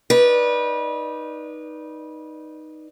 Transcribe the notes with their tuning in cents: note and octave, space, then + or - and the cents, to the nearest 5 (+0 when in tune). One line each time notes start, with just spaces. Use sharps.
D#4 +0 B4 -25 D5 +0